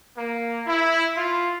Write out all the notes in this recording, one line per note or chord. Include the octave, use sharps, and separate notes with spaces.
A#3
E4
F4